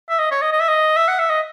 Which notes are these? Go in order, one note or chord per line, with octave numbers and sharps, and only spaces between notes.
E5
D#5
C#5
D#5
D#5
E5
D#5
E5
F#5
E5
D#5